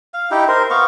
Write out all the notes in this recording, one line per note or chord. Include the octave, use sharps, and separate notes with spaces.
F5
D#4 E4 G4
A#4 C5
B3 F5 C#6